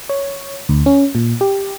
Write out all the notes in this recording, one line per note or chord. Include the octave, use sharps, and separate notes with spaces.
C#5
D2
C#4
A#2
G4